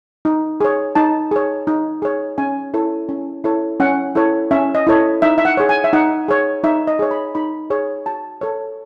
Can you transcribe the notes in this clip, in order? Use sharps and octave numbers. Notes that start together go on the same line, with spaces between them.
D#4
G#4 C#5
D#4 A5
G#4 C#5
D#4
G#4 C#5
C#4 G#5
E4 A4 C#5
C#4
E4 A4 C#5
C#4 F#5
E4 A4 C#5
C#4 E5
D#5
E4 A4 C#5
D#4 E5
E5
F#5
G#4 C#5
G#5
E5
D#4 F#5
G#4 C#5
D#4 E5
D#5
G#4 C#5
B5
D#4 B5
G#4 C#5
F#4 A5
A4 C#5